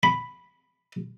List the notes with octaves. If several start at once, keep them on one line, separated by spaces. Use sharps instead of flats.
B5